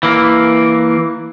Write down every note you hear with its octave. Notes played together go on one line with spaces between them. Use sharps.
E3 A#3